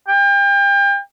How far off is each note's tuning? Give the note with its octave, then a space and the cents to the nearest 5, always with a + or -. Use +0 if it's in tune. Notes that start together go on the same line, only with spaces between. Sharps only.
G5 +35